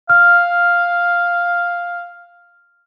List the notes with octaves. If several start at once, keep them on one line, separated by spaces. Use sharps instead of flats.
F5 F6